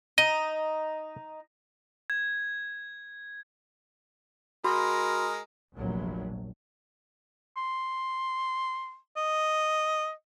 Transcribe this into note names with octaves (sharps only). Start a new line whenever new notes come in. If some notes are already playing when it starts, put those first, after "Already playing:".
D#4 D#5
G#6
G#3 F#4 A#4 B5 C6
F1 A#1 F#3
C6
D#5